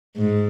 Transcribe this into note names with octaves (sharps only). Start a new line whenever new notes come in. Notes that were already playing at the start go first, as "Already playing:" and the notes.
G#2